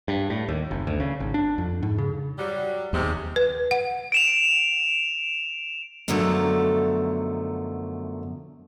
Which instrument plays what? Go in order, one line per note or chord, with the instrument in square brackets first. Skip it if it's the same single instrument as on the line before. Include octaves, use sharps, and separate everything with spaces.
[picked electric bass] G2
A2
D#2
F#1
D2
C#3
G#1
D4
F2
G#2
C#3
[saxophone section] F#3 G3
[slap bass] D#2 [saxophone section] G#2 C3
[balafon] B4
F#5
[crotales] D7 E7 F7
[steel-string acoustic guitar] F#2 B2 D3 F3 F#3 A3